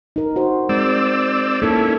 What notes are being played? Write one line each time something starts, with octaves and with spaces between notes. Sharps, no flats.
D#4 A#4
F#4 A#4 C5
G#3 C4 D5 E6
A#3 C#4 D#4 E4 A4